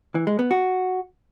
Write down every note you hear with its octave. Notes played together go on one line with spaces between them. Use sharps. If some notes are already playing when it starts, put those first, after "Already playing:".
E3
G#3
B3
F#4